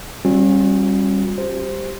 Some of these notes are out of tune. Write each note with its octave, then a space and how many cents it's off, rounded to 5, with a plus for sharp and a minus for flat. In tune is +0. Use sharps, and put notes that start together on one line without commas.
G3 +0 C#4 -40 F#4 -45
G4 +0 C5 +0